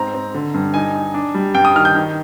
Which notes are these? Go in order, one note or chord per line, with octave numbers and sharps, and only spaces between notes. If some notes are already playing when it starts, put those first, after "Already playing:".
Already playing: G#2 C4 A#5
C4
D3
G2
D#4 G#5
D#4
D4
G3
G2 G5
D#6
D#3 F6
G6
D#3